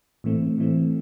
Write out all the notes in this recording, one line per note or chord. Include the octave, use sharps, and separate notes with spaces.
A2 E3 A3 C4
A2 E3 A3 C4